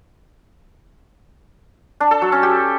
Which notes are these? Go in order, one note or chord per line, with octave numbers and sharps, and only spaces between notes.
D4
A4
F#3
C#4
G4